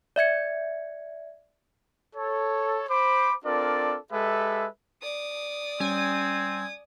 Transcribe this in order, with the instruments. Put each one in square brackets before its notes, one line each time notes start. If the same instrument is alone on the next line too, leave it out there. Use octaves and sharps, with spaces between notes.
[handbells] D5 E5 G#6 C#7
[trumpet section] A4 C#5
C5 B5 D6
C4 D4 F4 A4 A#4 D5
G#3 G4 A4 B4 E5
[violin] D5 D#6
[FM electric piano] G3 C#4 [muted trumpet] C4 [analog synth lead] G#5